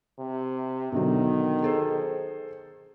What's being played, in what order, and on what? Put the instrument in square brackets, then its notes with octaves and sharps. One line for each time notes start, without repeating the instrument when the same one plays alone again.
[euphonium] C3
[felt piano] B2 D3 F#3 [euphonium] D#3
[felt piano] G#4 A4 C5